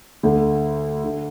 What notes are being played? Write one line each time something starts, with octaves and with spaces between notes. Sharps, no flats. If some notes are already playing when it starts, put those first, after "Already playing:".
D2 D3
D3